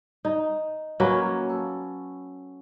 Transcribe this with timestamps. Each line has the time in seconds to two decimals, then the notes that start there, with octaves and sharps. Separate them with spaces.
0.25 D#4
1.00 F#3 A#3 C#4 B4
1.49 A4